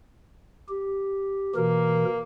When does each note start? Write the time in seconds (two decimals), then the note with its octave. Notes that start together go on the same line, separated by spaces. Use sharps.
0.69 G4
1.55 B2 E3 A#3 A#4